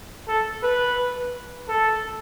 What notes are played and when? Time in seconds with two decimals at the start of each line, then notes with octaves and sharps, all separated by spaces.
0.28 A4
0.63 B4
1.69 A4